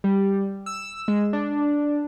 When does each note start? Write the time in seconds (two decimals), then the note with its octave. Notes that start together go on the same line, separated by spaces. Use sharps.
0.04 G3
0.66 E6
1.08 G#3
1.33 D4